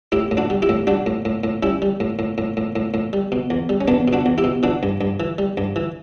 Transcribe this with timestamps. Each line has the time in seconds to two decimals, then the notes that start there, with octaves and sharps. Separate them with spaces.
0.12 A2 E4 G4
0.31 A2
0.37 D4 F#4
0.50 G3
0.62 E4 G4
0.69 A2
0.87 G3 D4 F#4
1.06 A2
1.25 A2
1.44 A2
1.63 G3 C#4 E4
1.82 G3
2.00 A2
2.19 A2
2.38 A2
2.57 A2
2.76 A2
2.94 A2
3.13 G3
3.32 B2
3.50 E2
3.69 G3
3.81 C#4
3.88 E2 B3 D4
4.08 B2
4.13 D4 F#4
4.26 E2
4.38 E4 G4
4.44 B2
4.63 E3 D4 F#4
4.83 G2
5.01 G2
5.20 E3
5.38 G3
5.57 G2
5.76 E3